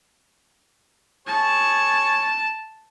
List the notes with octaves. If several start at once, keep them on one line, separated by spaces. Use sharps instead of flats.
G#4 C#5 A5